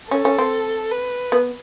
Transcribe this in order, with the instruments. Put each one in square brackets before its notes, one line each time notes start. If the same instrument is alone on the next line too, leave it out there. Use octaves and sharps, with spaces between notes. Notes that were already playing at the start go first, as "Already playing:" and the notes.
[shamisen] C#4 [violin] A4
[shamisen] C#4
C4
[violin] B4
[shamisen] B3